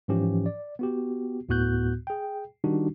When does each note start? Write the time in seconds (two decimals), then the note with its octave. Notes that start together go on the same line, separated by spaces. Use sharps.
0.08 G#2 E3 F3 C#4 G4
0.46 D5
0.79 B3 F#4 G4
1.49 D2 A2 B3 F#4 F#6 G6
2.07 G#4 G5
2.64 D#3 G3 D4 D#4 F#4 G4